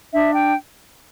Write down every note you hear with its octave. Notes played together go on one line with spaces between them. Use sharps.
D4 E5
G5